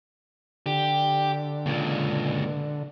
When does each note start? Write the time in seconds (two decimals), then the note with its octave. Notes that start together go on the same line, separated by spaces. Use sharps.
0.66 D3 G4
1.66 C#2 A#2